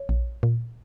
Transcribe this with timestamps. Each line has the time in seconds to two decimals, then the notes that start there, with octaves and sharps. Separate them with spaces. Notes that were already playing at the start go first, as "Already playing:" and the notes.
Already playing: C#5
0.09 A#1
0.43 A#2